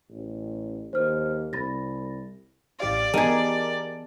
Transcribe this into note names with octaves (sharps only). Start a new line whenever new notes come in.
A1
D#2 C5 F6
C2 B5 A6 A#6
A1 G4 D5 F5
E3 B3 D#4 G4 G#4 A#4 A5